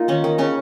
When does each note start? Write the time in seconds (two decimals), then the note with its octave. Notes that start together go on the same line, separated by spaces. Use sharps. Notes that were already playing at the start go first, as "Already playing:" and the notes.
Already playing: A#3 D#4 F4
0.08 D#3 C#4
0.24 D#3
0.38 C#3 C#4